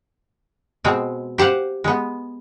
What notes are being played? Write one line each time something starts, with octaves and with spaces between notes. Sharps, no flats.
B2 G#3 C4
G4 C5 F5 F#5
G#3 B3